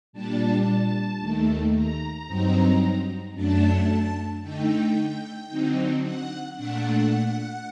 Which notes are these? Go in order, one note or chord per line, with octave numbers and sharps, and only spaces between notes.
A#2 G3 D4 A5
D#2 D#3 A3
A#5
G2 F#3 C4 D#4
F#2 F#3 A3 D4 A5
D3 A3 D#4 G5
D3 F#3 C4 D#4
F#5
A#2 A3 D4 F#5